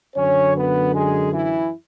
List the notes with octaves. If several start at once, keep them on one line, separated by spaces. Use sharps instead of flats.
F#2 D3 C#4 C#5
B3 B4
G#3 G#4
E3 E4